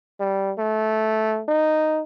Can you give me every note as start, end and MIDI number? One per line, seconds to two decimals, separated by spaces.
0.20 0.52 55
0.58 1.43 57
1.48 2.02 63